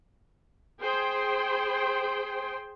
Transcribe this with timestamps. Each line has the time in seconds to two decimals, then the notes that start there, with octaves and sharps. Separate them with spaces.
0.81 G#4 C5 G5 C6